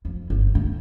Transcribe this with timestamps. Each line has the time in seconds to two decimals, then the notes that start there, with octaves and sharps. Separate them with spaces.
0.05 F2
0.30 G1
0.55 D3